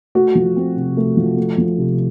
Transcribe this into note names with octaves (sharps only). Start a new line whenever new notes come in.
A3 F#4
F3
C4
C3
A3
F3
A3
F3
C3